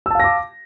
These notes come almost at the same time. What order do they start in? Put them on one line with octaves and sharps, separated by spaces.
E6 A5 F5 A#6 D6